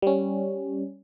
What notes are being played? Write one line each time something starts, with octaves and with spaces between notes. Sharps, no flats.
G3 C#4